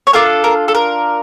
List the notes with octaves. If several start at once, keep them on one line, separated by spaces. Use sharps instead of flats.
C#5
D4 F4 A4 A#4
A#4
A4
A#4